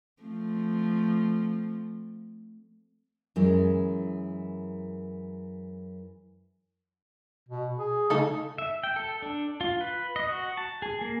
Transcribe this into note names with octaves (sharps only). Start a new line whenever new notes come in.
F3 A3 C4
F#2 E3 G#3
B2
G#4
C#3 A3 D#4 A4
E5
G5
A4
D4
F4
B4
D#5
F#4
A5
G#4
A#3